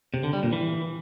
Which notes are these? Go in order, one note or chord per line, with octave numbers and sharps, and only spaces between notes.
C3
D3
G3
A#2
E3